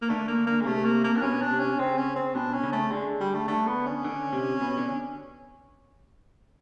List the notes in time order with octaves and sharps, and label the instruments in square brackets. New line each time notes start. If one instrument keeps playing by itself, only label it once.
[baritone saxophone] A#3
[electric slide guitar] D3 [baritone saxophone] A3
[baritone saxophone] A#3
A#3
G#3
[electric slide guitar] C3 [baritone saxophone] A3
[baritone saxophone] A#3
A#3
D4
[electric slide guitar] B2 [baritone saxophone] C#4
[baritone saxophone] D4
[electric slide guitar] C3
[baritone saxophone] C#4
[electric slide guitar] C#3 [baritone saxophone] C4
[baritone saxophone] C#4
C4
[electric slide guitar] B2 [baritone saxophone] D4
[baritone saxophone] C#4
[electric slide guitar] C#3
[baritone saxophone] A3
[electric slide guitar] D3 [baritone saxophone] G#3
[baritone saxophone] G3
A3
[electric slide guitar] D3 [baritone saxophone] A3
[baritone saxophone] B3
C#4
[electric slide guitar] D3
C3
B2
D3